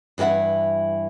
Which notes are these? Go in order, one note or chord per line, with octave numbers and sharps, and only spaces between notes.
G2 E3 G4 E5 F#5